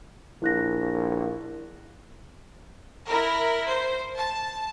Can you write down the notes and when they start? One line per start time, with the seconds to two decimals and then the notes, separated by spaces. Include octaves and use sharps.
0.42 A#1 E4 F#6 A#6
3.07 E4 A#4
3.67 C5
4.17 A5